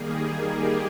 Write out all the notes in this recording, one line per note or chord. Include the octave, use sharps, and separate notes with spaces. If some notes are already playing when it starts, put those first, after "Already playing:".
Already playing: D#3 G3 A#3 G#4
G#4
G4